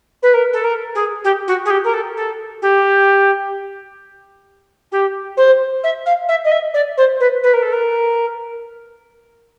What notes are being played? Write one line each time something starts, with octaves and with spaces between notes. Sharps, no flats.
B4
A#4
A4
A#4
G#4
G4
F#4
G#4
G4
A#4
A4
A4
G4
G4
C5
E5
F5
E5
D#5
E5
D5
C5
B4
B4
A#4
A4
A#4